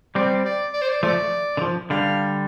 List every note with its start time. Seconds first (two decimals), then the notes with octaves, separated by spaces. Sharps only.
0.15 G3 C4 D5
0.45 D5
0.73 D5
0.81 C5
0.89 D5
1.03 F3 A3 D5
1.57 D3
1.61 F3
1.90 D3 G3 F5